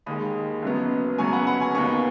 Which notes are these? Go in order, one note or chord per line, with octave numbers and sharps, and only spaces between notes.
D#2 D#3 G#3 B5 D#6
F#1 F#2 F#3 B3
F#1 F#2 F#3 B3 G#5 C#6
F#5 B5
F#5 B5
G#5 C#6
D#2 D#3 B3 G#5 C#6